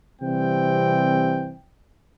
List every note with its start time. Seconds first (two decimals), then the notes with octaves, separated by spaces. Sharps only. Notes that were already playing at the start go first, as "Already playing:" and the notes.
0.22 C3 E3 G3 C4 G5